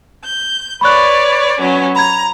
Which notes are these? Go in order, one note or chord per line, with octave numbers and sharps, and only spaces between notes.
G6
B4 C#5 D5 B5 C#6 F#6
F#3 B3 C#4
A#5 B5 G#6